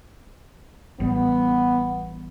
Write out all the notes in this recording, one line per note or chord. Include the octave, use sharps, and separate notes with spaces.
A1 G3 B3